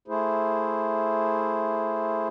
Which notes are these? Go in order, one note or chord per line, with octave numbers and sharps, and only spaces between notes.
A3 E4 G#4 C5